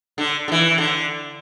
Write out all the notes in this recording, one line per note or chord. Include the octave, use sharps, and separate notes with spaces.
D3
D3
E3
D3